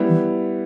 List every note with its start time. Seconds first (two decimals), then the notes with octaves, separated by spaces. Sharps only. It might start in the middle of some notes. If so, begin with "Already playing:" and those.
Already playing: G3 B3 E4
0.09 E3